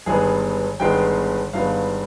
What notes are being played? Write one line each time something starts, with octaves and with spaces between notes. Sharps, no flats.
G1 G2 D#3 G#3 B3 G#4
G1 G2 D#3 G#3 B3 G5
G1 G2 D#3 G#3 B3 F5